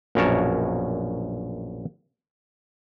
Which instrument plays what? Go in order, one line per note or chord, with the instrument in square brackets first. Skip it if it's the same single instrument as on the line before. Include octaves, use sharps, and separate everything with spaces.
[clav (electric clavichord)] A#1 F#2 B2 A#4 C#5 A5